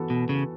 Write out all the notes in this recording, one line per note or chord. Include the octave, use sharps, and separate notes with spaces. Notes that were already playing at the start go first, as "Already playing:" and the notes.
Already playing: E3 B3 F#4 A4
B2
C#3